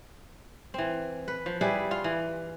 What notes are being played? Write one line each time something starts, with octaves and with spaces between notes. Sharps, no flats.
E3 C4
B4
F3
G3 E4 G#4 B4
F4 F5
E3